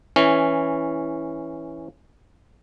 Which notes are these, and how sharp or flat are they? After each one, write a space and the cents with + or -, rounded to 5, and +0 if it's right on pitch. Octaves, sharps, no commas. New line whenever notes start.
E3 +0 C#4 +0